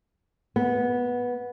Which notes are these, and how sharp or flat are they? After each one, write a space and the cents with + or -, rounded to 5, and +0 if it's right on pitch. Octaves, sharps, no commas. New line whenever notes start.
B3 -10